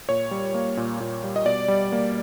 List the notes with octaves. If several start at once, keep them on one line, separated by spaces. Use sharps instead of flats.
A#2 C#5
G3
A#3
A#2
A#2
G3
D#5
B2 D5
G3
A#3